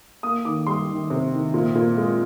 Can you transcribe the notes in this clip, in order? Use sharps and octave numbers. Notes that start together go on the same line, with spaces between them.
A#3 D#6
D#3 D6
G3 C6
D#3
C3
D#3
A#2
A#2
G#3